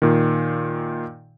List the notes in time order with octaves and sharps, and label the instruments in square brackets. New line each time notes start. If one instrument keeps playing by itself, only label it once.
[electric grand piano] A#2 D#3